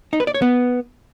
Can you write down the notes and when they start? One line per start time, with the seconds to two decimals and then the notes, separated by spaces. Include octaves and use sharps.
0.13 D#4
0.20 B4
0.27 D5
0.34 C#5
0.42 B3